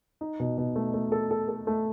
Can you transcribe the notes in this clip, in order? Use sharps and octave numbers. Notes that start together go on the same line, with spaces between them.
D#4
B2
B2
A3
A3
A4
A4
A4
A3